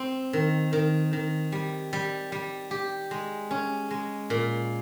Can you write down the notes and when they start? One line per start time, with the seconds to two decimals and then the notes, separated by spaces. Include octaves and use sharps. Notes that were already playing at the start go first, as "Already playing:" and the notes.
Already playing: C4
0.33 D#3
0.73 D#3
1.13 D#3
1.52 G3
1.93 G3
2.32 G3
2.71 G4
3.11 G#3
3.51 C#4
3.91 G#3
4.30 A#2